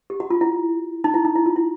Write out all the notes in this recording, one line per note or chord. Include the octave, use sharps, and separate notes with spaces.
G4
F#4
F4
E4
D#4
E4
D#4
E4
F4
E4